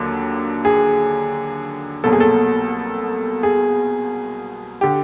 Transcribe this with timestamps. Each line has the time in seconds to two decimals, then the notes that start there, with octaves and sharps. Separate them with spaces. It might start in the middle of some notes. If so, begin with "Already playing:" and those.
Already playing: D#2 D3 F#3 A#3
0.65 G#4
2.04 C2 B2 F#3 A#3 A4
2.13 G#4
2.20 A4
3.43 G#4
4.81 D3 G4